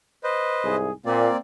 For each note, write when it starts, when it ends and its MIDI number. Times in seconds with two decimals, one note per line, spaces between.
0.24 0.76 71
0.24 0.76 72
0.24 0.76 75
0.64 0.91 36
0.64 0.91 44
0.64 0.91 68
1.06 1.28 46
1.06 1.37 58
1.06 1.37 60
1.06 1.37 74